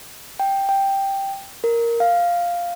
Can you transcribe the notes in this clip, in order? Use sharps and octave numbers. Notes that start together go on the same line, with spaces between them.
G5
G5
A#4
F5